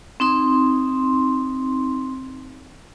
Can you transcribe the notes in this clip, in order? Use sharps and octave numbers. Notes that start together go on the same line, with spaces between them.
C4 D#4 C6